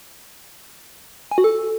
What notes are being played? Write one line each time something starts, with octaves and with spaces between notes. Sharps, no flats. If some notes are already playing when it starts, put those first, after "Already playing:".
G#5
F#4
A4